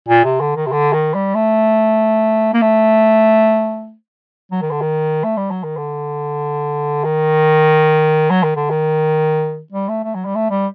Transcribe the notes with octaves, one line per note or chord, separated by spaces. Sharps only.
A#2
C3
D3
D#3
C3
D3
D#3
G3
A3
A#3
A3
F#3
D#3
D3
D#3
A3
G3
F#3
D#3
D3
D#3
F#3
D#3
D3
D#3
G3
A3
A3
F#3
G3
A3
G3